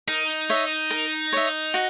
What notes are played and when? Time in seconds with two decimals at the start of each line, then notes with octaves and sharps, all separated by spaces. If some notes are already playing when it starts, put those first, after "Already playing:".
0.08 D#4 A#4
0.49 C#5 E5
0.91 A#4
1.33 C#5 E5
1.74 F#4